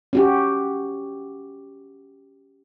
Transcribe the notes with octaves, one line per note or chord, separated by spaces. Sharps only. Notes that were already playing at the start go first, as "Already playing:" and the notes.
C#4 F#4 G4